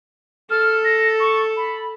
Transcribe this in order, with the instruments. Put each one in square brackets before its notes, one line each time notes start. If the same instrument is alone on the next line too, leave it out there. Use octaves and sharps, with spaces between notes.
[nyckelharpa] A4 [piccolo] F6
[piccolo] A#6
C#6
B5